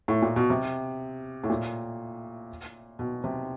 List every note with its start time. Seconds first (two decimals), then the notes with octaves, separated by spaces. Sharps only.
0.08 A2
0.22 A#2
0.36 B2
0.50 C3
1.44 A2
1.50 A#2
2.99 B2
3.24 C3